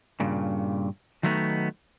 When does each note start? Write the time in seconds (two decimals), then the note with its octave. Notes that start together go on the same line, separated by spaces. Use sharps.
0.20 G2 A#2 C#3
1.23 D#3 F#3 G3 A3 B3 D#4